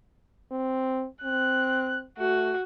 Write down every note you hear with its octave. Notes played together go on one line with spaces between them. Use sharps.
C4
C4 F#6
A3 F#4